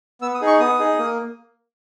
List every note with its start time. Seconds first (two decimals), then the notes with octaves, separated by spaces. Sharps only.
0.21 B3 E6
0.34 D#6
0.41 D#4 G#4
0.47 C#6
0.60 B3 D#6
0.79 D#4 G#4
0.98 A#3